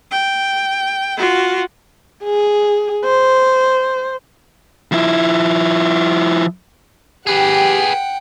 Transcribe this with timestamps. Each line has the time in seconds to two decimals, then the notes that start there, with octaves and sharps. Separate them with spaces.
0.11 G5
1.18 F4 F#4
2.23 G#4
3.05 C5
4.92 F3 E4
7.27 G4 G#4 B4 F#5 G5